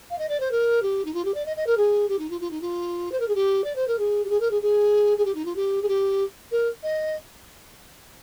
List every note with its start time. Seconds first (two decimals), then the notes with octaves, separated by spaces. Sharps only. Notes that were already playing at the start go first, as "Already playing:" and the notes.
0.10 F5
0.18 D#5
0.29 D5
0.40 C5
0.51 A#4
0.82 G4
1.05 D#4
1.14 F4
1.25 G4
1.34 D5
1.46 D#5
1.56 D#5
1.67 A#4
1.77 G#4
2.09 G4
2.19 D#4
2.30 F4
2.41 F4
2.51 D#4
2.61 F4
3.12 C5
3.20 A#4
3.28 G#4
3.35 G4
3.64 D5
3.75 C5
3.87 A#4
3.99 G#4
4.24 G4
4.29 G#4
4.40 A#4
4.51 G#4
4.62 G#4
5.18 G#4
5.25 G4
5.35 D#4
5.45 F4
5.56 G4
5.82 G#4
5.88 G4
6.51 A#4
6.83 D#5